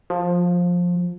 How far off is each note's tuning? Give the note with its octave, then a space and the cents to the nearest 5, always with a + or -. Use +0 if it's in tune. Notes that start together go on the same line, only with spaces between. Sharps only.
F3 +15